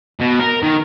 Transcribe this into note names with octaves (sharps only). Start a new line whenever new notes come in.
B2
A#4
D#3